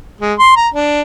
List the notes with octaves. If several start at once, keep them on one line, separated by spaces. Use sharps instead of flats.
G#3
C6
A#5
D4